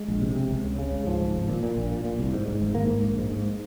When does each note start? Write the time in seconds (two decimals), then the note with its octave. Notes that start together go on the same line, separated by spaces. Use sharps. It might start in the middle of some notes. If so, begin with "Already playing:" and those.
Already playing: G#3
0.08 A#1
0.21 C3
0.36 C3
0.50 C#2
0.64 C#3
0.79 C#3
0.92 C#2
1.06 G#2 F3
1.21 G#2
1.34 G#1
1.49 A#2
1.63 A#2
1.77 A#1
1.91 A#2
2.05 A#2
2.19 C2
2.33 G#2
2.48 G#2
2.62 G#1
2.75 G#2 A#3
2.89 G#2
3.03 A#1
3.18 G#2
3.32 G#2